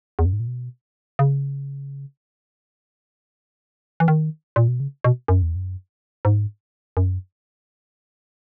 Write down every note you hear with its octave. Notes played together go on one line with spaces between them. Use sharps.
E2
F#2
G#2
A#2
B2
C#3
E3
D#3
A#2
B2
C#3
B2
F#2
E2
F#2
G#2
F#2